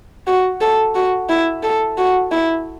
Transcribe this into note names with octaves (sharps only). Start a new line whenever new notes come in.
F#4
A4
F#4
E4
A4
F#4
E4